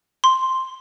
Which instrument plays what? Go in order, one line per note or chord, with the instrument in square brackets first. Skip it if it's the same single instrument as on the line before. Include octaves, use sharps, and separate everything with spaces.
[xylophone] C6